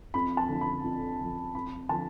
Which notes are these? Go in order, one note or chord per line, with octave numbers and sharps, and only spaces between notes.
F2 B5
A5
D3 F3
B5
F2
D3 F3
F2 B5
D3 F3 A5